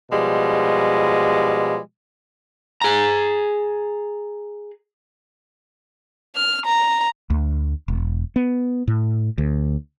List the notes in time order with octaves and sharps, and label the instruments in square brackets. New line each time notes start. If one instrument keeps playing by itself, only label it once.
[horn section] B2 F3 G3 G#3
[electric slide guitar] G#4 A#5
[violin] F6
A#5
[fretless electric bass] D2
E1
B3
A2
D2